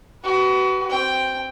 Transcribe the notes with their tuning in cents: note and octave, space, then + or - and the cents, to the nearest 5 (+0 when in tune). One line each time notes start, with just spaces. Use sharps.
F#4 +35 B4 +0
C4 -5 G5 +0